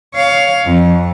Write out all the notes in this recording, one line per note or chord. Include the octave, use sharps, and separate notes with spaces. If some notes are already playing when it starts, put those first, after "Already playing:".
C#5 F5
F2